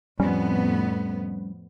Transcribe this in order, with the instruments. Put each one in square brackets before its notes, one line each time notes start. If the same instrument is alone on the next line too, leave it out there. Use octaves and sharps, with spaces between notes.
[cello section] F2 A2 B3 [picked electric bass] G3 C#4